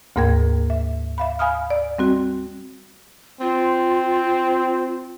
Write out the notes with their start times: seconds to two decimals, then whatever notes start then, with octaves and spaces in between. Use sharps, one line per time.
0.16 D2 G#2 A#3 A#4 G5 G#6
0.70 E5
1.18 E5 F5 B5
1.39 F5 G#5 B5 D#6 F6
1.70 D5
1.98 G3 C4 F#4
3.41 C4 F4